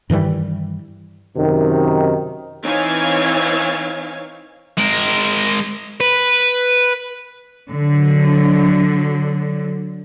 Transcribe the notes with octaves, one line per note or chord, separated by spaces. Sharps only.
G2 D#3 E3 G3
F#2 C3 D#3
E3 C4 D#4 C#5 F5 G#5
G#3 A#4
B4
D3 F#3